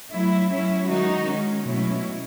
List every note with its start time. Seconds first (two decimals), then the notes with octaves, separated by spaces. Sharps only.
0.11 F#3 A3 E4
0.50 F#3 C#4 E4
0.88 D#3 G#3 D#4 F#4
1.27 D#3 G#3 C#4
1.65 B2 F#3 A3 C#4 E4